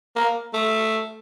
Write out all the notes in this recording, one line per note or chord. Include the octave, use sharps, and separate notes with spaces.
A#3
A3